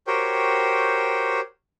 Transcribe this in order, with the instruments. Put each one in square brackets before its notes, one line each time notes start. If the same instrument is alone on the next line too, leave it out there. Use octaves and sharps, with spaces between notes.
[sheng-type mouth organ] F#4 G4 A#4 C5 C#5 G5